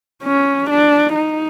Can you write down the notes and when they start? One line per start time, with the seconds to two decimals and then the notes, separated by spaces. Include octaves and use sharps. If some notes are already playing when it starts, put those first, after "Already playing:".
0.24 C#4
0.70 D4
1.15 D#4